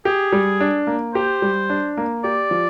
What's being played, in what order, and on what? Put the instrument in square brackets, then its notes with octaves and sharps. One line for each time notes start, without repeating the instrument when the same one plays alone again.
[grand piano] G4 [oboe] G#4
[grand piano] G3
D4
A#3
[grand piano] G4 [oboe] C5
[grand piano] G3
D4
A#3
[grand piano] G4 [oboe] D5
[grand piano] F3